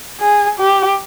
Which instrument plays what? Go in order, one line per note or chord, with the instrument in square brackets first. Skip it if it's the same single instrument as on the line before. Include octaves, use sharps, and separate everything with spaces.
[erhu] G#4
G4